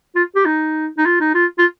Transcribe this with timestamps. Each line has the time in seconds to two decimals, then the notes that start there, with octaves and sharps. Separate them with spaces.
0.15 F4
0.35 G4
0.45 D#4
0.98 D#4
1.06 F4
1.21 D#4
1.35 F4
1.58 F4